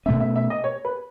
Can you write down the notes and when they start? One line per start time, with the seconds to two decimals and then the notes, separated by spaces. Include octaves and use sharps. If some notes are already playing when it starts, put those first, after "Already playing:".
0.06 B2 A3 C#4 E5
0.20 E5
0.36 E5
0.50 D#5
0.64 C#5
0.85 B4